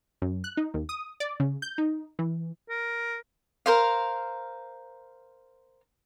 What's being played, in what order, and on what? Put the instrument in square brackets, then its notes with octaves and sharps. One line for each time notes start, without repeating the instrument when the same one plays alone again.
[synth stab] F#2
F#6
D#4
D#2
D#6
D5
C#3
G6
D#4
E3
[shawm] A#4
[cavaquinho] A#4 C5 F5